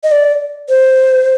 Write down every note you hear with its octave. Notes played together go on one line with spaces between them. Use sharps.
D#5
D5
C5